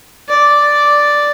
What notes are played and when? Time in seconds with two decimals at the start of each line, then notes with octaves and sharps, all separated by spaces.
0.29 D5